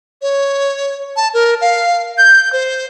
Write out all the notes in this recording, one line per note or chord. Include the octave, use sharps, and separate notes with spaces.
C#5
A5
A#4
F5
G6
C5